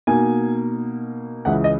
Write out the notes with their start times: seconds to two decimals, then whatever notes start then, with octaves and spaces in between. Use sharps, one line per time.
0.07 B2 A#3 D#4 G#5
1.45 C#2 C#3 E3 F#5
1.64 D#5